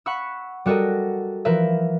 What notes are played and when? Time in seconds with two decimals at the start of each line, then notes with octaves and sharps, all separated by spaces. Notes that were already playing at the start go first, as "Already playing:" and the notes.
0.06 F#5 B5 C#6 E6
0.66 G3 F#4 A4 A#4 D#5
1.45 E3 F3 A#4 B4 E5